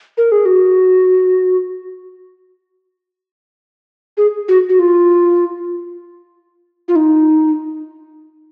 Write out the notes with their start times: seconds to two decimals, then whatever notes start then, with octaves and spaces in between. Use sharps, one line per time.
0.17 A#4
0.32 G#4
0.45 F#4
4.17 G#4
4.48 F#4
4.69 F#4
4.79 F4
6.88 F4
6.96 D#4